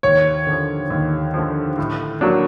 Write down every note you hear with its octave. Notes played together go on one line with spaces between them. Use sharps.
D#2 C#5
D3 F3
D#2
D3 F3
A2
F#3 A#3 D4